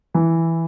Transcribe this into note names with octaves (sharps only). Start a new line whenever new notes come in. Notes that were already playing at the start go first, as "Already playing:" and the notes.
E3